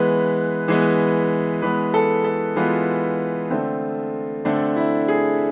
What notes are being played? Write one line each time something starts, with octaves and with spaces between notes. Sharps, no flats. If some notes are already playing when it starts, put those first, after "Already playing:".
Already playing: E3 G#3 B3 B4
E3 G#3 B3
E3 G#3 B3 B4
A4
A4
E3 G#3 B3 F4
D3 A3 C4
D3 A3 C4 D4
E4
G#4